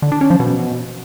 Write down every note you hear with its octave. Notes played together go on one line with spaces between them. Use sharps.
D3
D4
C#4
F3
B2